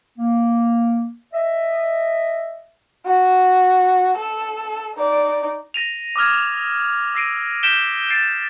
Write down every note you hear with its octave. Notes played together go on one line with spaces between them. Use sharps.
A#3
D#5 E5
F#4
A4
D#4 D5
A#6 D#7 F7
D6 D#6 F6 G#6
E6 A#6 C7 D7 D#7
G6 B6 D7 E7 G7
A6 C7 D7 G7